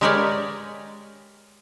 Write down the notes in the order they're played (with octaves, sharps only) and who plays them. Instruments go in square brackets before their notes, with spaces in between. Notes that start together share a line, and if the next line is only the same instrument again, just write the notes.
[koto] G#3 G4 A#4 B4 C#5 D5